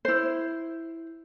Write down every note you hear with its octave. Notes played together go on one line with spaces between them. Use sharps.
E4 C5